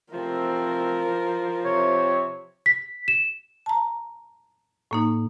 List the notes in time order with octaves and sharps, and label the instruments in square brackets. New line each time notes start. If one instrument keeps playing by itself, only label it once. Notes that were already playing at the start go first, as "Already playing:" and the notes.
[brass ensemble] C3 A3 C4 [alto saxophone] F3 [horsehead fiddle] A#4
[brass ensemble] C3 [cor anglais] C#5
[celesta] B6
E7
[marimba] A5 A#5
A2 A#3 D#4